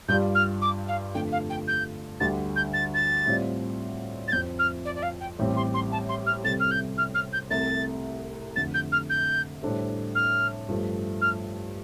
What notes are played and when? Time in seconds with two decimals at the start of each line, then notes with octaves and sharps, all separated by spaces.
0.08 G2 G3 F4 D5 G6
0.35 F6
0.62 D6
0.88 F5
1.15 F2 D3 A3 D4 F4 G5
1.32 F5
1.50 G5
1.68 G6
2.20 D2 D3 G3 A6
2.56 G6
2.73 A6
2.94 A6
3.26 A2 G3 C4 F4 D5
4.28 A6
4.32 F2 F3 C4 G6
4.59 F6
4.85 D5
4.95 D5
5.03 F5
5.21 G5
5.39 A1 A2 G3 C4 G4
5.56 C6
5.74 C6
5.92 A5
6.09 C6
6.26 F6
6.44 C2 C3 G3 C4 A4 A6
6.60 F6
6.71 G6
6.98 F6
7.15 F6
7.33 G6
7.50 C2 C3 A3 A6
8.56 F2 D3 A3 A6
8.74 G6
8.92 F6
9.10 G6
9.63 A2 G3 D4 A4 C5
10.15 F6
10.69 G2 F3 A3
11.21 F6